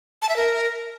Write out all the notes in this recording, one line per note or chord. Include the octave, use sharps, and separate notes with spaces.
A5
E5
A#4